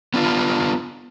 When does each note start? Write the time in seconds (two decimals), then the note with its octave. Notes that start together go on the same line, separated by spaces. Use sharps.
0.14 B3 D4 F4